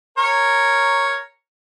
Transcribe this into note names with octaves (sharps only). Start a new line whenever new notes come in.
A#4 C#5